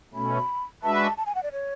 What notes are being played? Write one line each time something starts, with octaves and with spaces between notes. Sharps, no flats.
B2 A3 C#4 B5
G#3 D4 F#4 B4 E5 A5
B5
A5
A5
G#5
F#5
D5
C#5